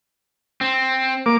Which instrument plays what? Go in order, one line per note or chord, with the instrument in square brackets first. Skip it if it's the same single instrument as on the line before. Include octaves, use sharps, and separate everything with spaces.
[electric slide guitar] C4
[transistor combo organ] A#3 D6